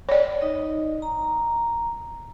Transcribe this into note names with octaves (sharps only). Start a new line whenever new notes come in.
C#5 D5
D#4 D#5
A#5